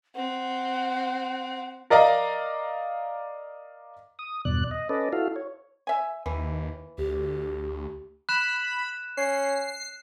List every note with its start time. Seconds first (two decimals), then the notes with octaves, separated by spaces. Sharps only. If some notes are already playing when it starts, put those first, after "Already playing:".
0.15 C4 F#5
1.90 A#4 D5 D#5 F5 A#5
4.19 D#6
4.45 E2 G2 B2 D5 F#6
4.71 D#5
4.89 C#4 A4 B4 D5 D#5
5.13 E4 F#4 A4 F5
5.36 C#5
5.87 E5 G#5
6.26 D#2 E3
6.98 D2 G4
8.29 B5 F#6 E7
9.17 C#4 C7